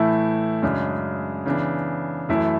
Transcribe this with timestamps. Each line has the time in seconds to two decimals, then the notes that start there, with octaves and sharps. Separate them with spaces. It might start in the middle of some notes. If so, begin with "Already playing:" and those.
Already playing: A2 E3 A3 E4
0.62 F#2 C#3 G#3 D4
1.46 C#3 E3 B3 D4
2.29 F#2 E3 A3 E4